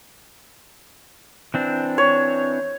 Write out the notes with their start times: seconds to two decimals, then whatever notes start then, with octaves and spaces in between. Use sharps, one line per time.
1.54 E3 C4 D4
1.98 C#5